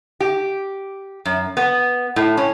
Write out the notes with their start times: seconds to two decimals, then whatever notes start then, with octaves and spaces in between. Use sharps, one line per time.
0.20 G4
1.25 F#2
1.57 B3
2.16 A2
2.37 C#4